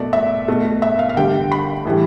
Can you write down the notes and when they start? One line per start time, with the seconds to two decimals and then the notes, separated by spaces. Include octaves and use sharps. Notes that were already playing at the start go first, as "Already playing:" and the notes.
Already playing: B2 A3 D5
0.13 E5
0.48 B2 A3
0.82 E5
0.99 F5
1.09 F5
1.17 D3 G3 G5
1.52 B5
1.85 A2 E3 G3